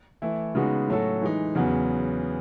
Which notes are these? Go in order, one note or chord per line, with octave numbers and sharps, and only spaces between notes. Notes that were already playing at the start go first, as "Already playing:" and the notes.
E3 A3 E4
C#3 G#3 B3 D#4 F#4
A2 F#3 C#4 F#4 A4
E3 G#3 D#4
E2 C#3 F#3 B3